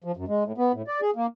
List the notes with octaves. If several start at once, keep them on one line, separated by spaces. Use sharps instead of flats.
F3
F#2
G#3
A2
B3
A2
D5
G#4
A#3